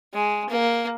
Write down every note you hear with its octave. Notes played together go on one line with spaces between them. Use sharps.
G#3
A#3